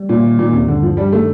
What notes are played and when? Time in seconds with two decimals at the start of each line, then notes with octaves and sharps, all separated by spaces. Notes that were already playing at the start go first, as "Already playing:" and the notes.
Already playing: G3
0.09 A#2 A#3
0.23 D#3
0.38 A#2 D#3
0.53 D#2 C3
0.68 G2 D3
0.83 G2 F3
0.97 G3 D4
1.12 D#3 A3